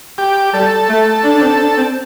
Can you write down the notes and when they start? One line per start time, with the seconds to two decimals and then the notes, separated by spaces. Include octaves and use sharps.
0.18 G4
0.54 G3 A4
0.89 A3
1.24 D4
1.35 D4
1.42 C4
1.60 D4
1.78 C4